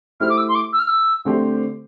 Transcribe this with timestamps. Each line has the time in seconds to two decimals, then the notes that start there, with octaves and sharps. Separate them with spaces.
0.20 A3 E4 G4 C5 F6
0.30 D6
0.38 E6
0.48 C6
0.55 D6
0.73 E6
0.79 F6
0.87 E6
1.25 D3 A3 C4 G4 C5